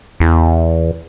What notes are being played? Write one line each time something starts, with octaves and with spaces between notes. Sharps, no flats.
E2